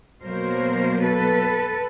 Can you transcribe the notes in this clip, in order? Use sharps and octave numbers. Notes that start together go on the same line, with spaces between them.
B2 F#3 A#3 A#4 C5
A4 B4